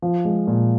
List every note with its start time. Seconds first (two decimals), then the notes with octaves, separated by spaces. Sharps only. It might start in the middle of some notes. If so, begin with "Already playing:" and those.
0.02 F3
0.25 G#3
0.47 A#2